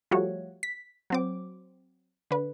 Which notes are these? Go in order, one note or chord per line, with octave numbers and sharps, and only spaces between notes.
F3 G3 A3 F#4 C#5
B6
F#3 C4 D6
D3 B4